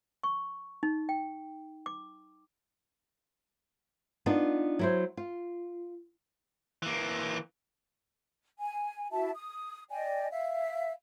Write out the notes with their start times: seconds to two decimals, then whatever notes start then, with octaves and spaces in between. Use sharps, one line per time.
0.23 C#6
0.83 D#4
1.09 G5
1.86 D6
4.26 B3 D4 D#4 F4
4.79 F#3 E4 C5
5.17 F4
6.83 E3 A#3
8.58 G#5
9.11 E4 F#4 E5 A5
9.35 D#6
9.89 D5 D#5 G5 G#5
10.30 E5 F5